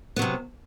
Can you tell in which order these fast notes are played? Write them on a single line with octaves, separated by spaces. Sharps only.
B3 F#3 C3